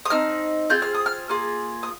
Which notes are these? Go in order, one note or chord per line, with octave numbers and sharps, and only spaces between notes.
D#6
C4 D#4 F6
C4 F4 G#4 G6
F6
D#6
F6
A#3 F4 G#4 D#6
D#6